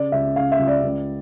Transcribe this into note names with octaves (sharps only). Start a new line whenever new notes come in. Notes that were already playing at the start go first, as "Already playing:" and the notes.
Already playing: C#3 D5
C#2 E5
C#3 F5
E5
C#2
D5
C#2